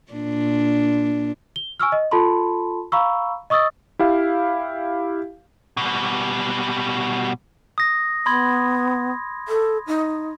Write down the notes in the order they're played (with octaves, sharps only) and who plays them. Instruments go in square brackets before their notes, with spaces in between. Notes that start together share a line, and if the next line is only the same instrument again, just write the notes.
[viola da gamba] A#2 D4
[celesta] G7
G#5 C#6 E6 F6
D#5
F4 A4 A5 B5 C6
F5 A#5 B5 C#6 E6
D#5 C#6 D#6 E6 A6
[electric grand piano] E4 G4 F5
[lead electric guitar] B2 G3
[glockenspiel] D#6 A#6
[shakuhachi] B3 [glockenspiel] B5 C6 G#6
[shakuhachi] A4
D#4